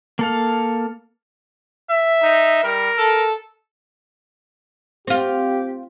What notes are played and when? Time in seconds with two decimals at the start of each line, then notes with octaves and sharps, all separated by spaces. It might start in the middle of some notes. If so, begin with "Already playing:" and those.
0.19 A#3 A4 F5
1.90 E5
2.23 D#4
2.64 G3 A#4
2.97 A4
5.07 C4 F4 G4